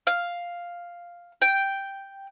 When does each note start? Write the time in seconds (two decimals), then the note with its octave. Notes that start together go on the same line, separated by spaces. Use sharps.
0.07 F5
1.42 G5